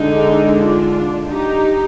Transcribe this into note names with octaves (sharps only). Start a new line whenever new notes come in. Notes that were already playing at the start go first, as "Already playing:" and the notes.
Already playing: D3 G#3 D4 D#4
D4 F4
D#4 G4